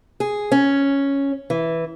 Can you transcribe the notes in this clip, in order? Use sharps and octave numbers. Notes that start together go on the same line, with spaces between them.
G#4
C#4
E3